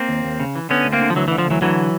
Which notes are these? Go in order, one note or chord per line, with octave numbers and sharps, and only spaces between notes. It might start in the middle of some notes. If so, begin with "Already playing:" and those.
Already playing: A#3 C4
D#2
D#2
C#3
E3
D3 B3 C#4
D2
A#3 C4
D3
F3
D2 E3 F#3
E3
D3
F3
D2 E3 F#3
D3 E3 F#3